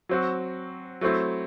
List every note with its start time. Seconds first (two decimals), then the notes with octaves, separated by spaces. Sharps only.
0.09 F#3 C4 F#4
1.01 F#3 A3 C4 E4